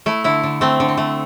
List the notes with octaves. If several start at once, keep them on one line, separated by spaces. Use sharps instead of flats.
A3 E4
D3 E4
D3
A3 C4
D3
C4
A3